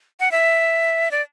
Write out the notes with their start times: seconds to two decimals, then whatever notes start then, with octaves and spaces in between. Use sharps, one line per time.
0.20 F#5
0.32 E5
1.11 D5